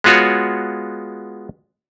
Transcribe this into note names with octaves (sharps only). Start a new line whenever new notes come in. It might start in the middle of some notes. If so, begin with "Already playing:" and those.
G#3 B3 F4 F#4 C#5